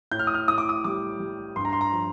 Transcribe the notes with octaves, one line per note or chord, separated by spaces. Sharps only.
A2 G6
F6
D#6
F6
A2 D#6
D6
D#6
G3 D6
G3
G2 C6
A#5
C6
A#5
F3